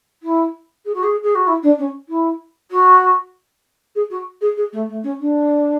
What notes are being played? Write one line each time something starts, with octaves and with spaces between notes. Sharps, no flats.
E4
G#4
F#4
G#4
G#4
F#4
E4
D4
C#4
E4
F#4
G#4
F#4
G#4
G#4
A3
A3
C#4
D4